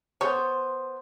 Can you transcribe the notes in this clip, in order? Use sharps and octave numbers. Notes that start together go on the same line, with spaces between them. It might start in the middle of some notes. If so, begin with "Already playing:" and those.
B3 C5 C#5